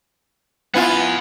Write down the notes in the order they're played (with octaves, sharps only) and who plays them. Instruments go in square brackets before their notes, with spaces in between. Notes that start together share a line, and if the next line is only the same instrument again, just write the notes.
[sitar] B3 E4 F4 [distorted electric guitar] F#5 G#5